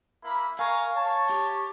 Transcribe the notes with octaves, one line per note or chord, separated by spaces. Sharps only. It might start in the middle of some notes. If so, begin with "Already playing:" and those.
A#3 E4 B5
A#4 F5 G#5 C#6
C#5 A5
G4